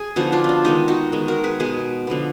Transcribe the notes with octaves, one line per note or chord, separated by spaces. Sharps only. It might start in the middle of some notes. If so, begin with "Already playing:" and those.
Already playing: G#4
D3 F3 B3 D#4 F#4
D4 F4
D4 D#4
D#3 G#3 B3 D#4
D#4 F#4
D#3 G#3 B3
F#4 A#4
G#4 B4
B2 G#3 B3 G#4 B4
D3 F3 B3